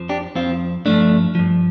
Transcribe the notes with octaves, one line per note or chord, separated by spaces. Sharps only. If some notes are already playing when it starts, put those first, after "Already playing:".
Already playing: F2 F3
D4 G4
F2 F3 C4 F4
G2 F3 A3 D4
G2 F3